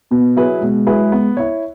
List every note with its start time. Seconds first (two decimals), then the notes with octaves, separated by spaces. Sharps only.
0.11 B2 B3
0.37 F#3 E4 G#4 B4
0.62 B2 G#3
0.87 F#3 E4 G#4 B4
1.12 B3
1.37 E4 C#5